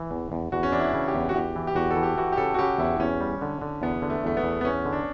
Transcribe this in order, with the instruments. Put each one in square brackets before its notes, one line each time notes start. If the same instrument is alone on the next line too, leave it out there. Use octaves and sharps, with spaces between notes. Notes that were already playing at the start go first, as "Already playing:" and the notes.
Already playing: [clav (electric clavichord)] E3
E2
E2
[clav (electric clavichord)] E2 [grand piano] F#4
[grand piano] C#4
[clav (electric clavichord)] E3 [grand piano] D4
[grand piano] E4
[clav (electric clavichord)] C#3
[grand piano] G4
[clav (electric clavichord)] E2
[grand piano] F#4
[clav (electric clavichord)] E2 [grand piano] G4
[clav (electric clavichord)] E3
[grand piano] G4
[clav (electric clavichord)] E2 [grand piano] F#4
[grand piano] A4
[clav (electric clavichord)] E3
[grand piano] G4
[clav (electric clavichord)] E3 [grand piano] F#4
[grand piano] G4
[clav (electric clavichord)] C#3 [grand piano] A4
[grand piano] F#4
[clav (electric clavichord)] C#3 [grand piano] G4
[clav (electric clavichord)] E2 [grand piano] E4
[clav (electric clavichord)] E2 [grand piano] C#4
[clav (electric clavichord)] G3
D3
D3
[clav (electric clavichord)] E2 [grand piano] B3
[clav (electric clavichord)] D3
[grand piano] A3
[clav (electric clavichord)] E2 [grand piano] A3
[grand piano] B3
[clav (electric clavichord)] E2
[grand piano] B3
[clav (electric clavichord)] E2 [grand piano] C#4
[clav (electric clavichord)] D3
[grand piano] D4